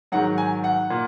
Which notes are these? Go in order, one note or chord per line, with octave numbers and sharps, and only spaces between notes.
G#2 D#3 F#3 F#5
G#5
F#5
A#2